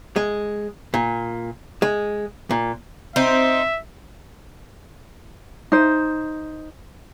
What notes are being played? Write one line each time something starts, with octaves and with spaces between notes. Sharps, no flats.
G#3
A#2
G#3
A#2
C4 D#4 E5
D#4 C5